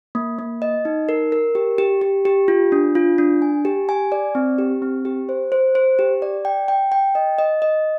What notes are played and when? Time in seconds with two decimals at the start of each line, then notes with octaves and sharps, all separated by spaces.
0.15 A#3
0.39 A#3
0.62 D#5
0.85 D#4
1.09 A#4
1.32 A#4
1.55 G4
1.78 G4
2.01 G4
2.25 G4
2.48 F4
2.72 D4
2.95 F4
3.18 D4
3.42 G#5
3.65 G4
3.89 G#5
4.12 D5
4.35 C4
4.58 G4
4.82 C4
5.05 G4
5.29 C5
5.52 C5
5.75 C5
5.99 G4
6.22 D5
6.45 G5
6.68 G5
6.92 G5
7.15 D#5
7.39 D#5
7.62 D#5